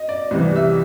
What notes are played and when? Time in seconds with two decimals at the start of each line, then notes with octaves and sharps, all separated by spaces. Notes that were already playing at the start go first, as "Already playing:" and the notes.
Already playing: D#5
0.09 D5
0.31 C2 C3 E3
0.56 E5